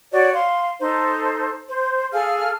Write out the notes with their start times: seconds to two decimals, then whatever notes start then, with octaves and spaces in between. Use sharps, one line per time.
0.12 F#4 C#5 D5
0.33 F5 C6
0.80 D#4 A4 C5
1.68 C5
2.12 G#4 A4 F5 F6